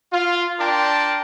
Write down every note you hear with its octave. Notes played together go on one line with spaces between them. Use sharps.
F4
D4 A#4 G5 A5 C6 D6